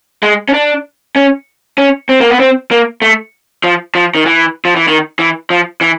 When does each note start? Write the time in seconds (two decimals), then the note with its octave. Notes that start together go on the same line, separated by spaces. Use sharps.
0.23 G#3
0.49 C#4
0.54 D4
1.16 C#4
1.78 C#4
2.09 C4
2.21 A#3
2.30 B3
2.40 C4
2.71 A#3
3.02 A3
3.64 F3
3.95 F3
4.15 D#3
4.26 E3
4.65 F3
4.76 E3
4.88 D#3
5.19 E3
5.50 F3
5.81 E3